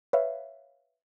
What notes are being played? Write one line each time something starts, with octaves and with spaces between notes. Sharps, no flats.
B4 C#5 E5 F5